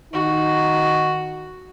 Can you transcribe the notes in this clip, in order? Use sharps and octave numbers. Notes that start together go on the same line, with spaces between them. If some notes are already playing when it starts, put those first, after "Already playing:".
D#3 D#4 F#4